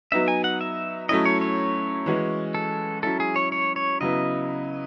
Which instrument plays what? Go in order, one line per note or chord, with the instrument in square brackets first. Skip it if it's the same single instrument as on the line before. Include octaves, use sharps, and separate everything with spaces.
[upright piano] F#3 B3 D#4 [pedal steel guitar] E5
[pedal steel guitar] G#5
F#5
E5
[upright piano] F#3 A3 C#4 E4 [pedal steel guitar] D#5
[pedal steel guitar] C#5
C#5
[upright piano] E3 G#3 C#4 F#4
[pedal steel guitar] A4
[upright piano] F#3 C#4 E4 [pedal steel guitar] A4
[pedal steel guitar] G#4
C#5
C#5
C#5
[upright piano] C#3 F#3 B3 E4 [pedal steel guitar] D#5